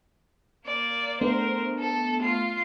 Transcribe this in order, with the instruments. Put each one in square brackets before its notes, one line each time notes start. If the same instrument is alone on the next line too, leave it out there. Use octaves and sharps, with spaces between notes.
[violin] A#3 D5
[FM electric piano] A3 B3 D4 [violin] A#4 C5
[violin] A4
F4 C7